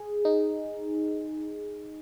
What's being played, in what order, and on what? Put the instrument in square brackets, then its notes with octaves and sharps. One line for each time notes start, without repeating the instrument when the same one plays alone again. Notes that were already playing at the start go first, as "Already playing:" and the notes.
Already playing: [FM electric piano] G#4
D#4